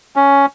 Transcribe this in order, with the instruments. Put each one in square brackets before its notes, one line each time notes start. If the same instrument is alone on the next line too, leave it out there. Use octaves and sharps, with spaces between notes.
[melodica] C#4